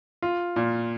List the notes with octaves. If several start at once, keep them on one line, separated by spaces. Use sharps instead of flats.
F4
A#2